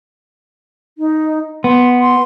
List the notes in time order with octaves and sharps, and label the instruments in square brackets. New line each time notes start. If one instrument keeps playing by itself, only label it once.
[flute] D#4
[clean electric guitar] B3 [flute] C6
[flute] C6